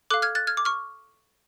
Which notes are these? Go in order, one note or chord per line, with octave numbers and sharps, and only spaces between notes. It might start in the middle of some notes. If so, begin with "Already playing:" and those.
A4 F5 D6 F#6
F6 G#6
F#6 A6
F6 G#6
D6
C#6 F6